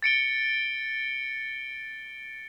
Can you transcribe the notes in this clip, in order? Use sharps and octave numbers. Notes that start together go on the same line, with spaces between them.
A6 C#7 D7 G7